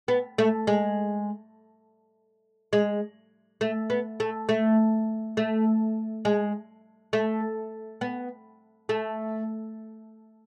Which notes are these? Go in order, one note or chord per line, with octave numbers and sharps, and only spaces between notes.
B3
A3
G#3
G#3
A3
B3
A3
A3
A3
G#3
A3
B3
A3